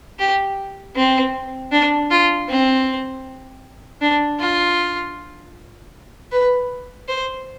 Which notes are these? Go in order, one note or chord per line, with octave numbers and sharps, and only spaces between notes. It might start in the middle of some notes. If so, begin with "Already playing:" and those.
G4
C4
D4
F4
C4
D4
F4
B4
C5